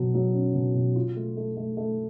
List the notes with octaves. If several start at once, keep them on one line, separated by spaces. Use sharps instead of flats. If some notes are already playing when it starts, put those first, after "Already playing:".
Already playing: B2 F#3
F#3
C#4
B2
B2
F4
A3
A3
A3
A3